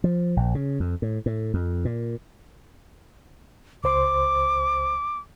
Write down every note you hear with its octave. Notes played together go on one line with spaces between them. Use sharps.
F3
A#1
C#3
F2
A2
A2
F2
A#2
C#2 C5 C6 D6